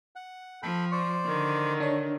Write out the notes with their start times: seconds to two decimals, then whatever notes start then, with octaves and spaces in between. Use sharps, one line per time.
0.16 F#5
0.63 F3 A4 G5 B5
0.92 C5 D5 C#6
1.26 D3 D#3
1.80 D4 C#5